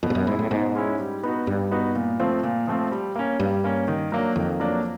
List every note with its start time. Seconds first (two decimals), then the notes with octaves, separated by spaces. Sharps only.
0.03 F2 B2
0.10 G2
0.15 F#2
0.27 G#2 G#3 C#4 E4
0.39 A2
0.51 G#2 B2
0.75 G#3 C#4 E4
0.99 G3
1.23 B3 D#4 F#4
1.47 G2 G3
1.71 B3 D#4 F#4
1.95 A#2
2.20 F3 A3 C4 F4
2.43 A#2
2.67 F3 A3 C4 F4
2.91 G3
3.16 A#3 C#4
3.39 G2 G3
3.64 A#3 C#4
3.88 D#3
4.12 F#3 A#3 D4
4.36 F2 D#3
4.60 F#3 A#3 D4